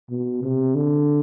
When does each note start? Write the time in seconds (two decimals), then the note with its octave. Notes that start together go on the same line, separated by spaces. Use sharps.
0.10 B2
0.43 C3
0.75 D3